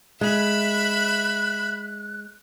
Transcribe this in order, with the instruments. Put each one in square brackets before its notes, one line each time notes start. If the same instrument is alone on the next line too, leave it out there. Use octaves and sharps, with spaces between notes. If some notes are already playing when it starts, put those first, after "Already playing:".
[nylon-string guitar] G#3 [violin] E5 B5 [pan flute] F#6